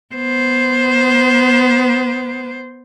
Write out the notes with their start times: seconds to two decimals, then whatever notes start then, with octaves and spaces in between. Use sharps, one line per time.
0.14 B3 C5